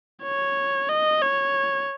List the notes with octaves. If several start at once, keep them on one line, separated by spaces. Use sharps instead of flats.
C#5
D#5
C#5